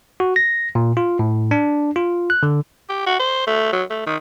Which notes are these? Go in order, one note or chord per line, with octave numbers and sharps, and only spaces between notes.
F#4
A#6
A#2
F4
A2
D4
F4
F#6
D3
G4
F#4
C5
A3
F#3
A3
D#3